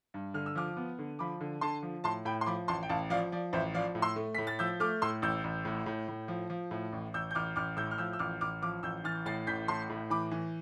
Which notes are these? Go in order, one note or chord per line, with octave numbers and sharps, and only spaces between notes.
G2
D3 F6
E6
F3 D6 F6
B3
D3
F3 B5 D6
D3
D3 A5 C6
F3
A2 A5 C6
A2 G5 B5
C6
F3 B5 D6
A1 A5 C6
G5
A1 F5 A5
F3 D5 F5
F3 D5
A1 C5 E5
F3 D5 F5
A2
C6 E6
A3
A2 B6
A6
F3 E6 G6
A3 D6 F6
A2 C6 E6
A1 E6 G6
A1
A2
A2
A2
F3
F3
A2
A1
A1 E6 G6
G6
A1 D6 F6
A1 D6 F6
A2 E6 G6
F6
F3 E6 G6
E6
A1 D6 F6
A1 D6 F6
F3 D6 F6
A1 E6 G6
E3 F6 A6
A2 A6 C7
A1 G6 B6
A2 A5 C6
A2
E3 B5 D6
E3